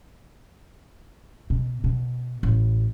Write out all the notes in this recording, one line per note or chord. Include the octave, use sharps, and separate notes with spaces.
B2
B2
A1